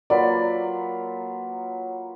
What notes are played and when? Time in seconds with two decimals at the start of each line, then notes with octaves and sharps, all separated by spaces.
0.10 F#3 A#3 F4 B4 D5